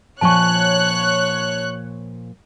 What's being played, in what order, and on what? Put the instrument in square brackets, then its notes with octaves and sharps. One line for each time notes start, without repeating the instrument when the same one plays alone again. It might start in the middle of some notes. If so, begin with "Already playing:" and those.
[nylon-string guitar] A#2 F3 G#5 [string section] C#5 F#6 [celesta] A5 C#6